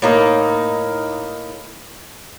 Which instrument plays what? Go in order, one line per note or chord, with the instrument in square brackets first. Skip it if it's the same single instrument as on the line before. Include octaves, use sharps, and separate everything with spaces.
[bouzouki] A2 A#3 D#4